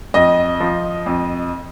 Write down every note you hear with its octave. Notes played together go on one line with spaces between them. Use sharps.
F2 D#5
F3
F2